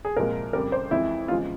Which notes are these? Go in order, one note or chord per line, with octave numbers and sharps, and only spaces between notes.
G#4
C2 A#2 F3 G#3 A#4
F2 C#3 G3 A#4
C5
F2 E3 G#3 E4
E2 C#3 F3 G#3 F4